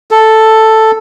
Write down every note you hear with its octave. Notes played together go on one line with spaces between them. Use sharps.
A4